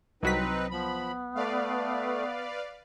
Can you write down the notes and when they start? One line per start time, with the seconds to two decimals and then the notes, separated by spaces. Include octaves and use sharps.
0.23 C2 F#3 C4 D#4 B4 B6
0.71 F3 B3 B5
1.35 A3 B4 D5 F5